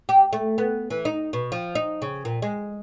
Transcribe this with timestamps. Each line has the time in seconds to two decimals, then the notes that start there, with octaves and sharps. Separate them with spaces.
0.09 G4
0.33 A3
0.58 B3
0.91 E3
1.05 D#4
1.33 B2
1.52 F3
1.75 D#4
2.02 C#3
2.25 A#2
2.42 G#3